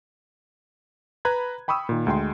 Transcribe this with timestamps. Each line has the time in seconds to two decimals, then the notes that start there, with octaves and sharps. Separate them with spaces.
1.25 B4 A#5 B5 F#6 G#6
1.68 G5 B5 C#6 D#6 E6
1.89 A#2 D#3
2.07 D2 G#3 G5 C6